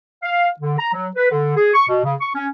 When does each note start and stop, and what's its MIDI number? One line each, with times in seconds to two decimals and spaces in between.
0.23 0.48 77
0.60 0.79 50
0.79 0.89 82
0.93 1.07 54
1.16 1.31 71
1.31 1.55 50
1.57 1.72 68
1.74 1.88 85
1.89 2.04 47
2.04 2.15 49
2.21 2.30 85
2.35 2.47 61